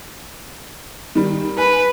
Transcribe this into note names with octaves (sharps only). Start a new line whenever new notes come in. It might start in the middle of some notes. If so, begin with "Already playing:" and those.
D#3 G3
B4 G#5